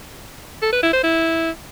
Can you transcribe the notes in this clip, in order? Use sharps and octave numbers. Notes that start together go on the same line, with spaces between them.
A4
B4
E4
C5
E4